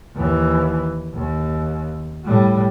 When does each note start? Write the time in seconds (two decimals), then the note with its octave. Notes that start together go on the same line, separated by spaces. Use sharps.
0.15 D#2 E3
1.14 D#2
2.24 A2 G3